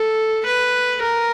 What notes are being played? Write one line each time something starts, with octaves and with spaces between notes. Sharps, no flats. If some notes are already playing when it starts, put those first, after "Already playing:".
Already playing: A4
B4
A#4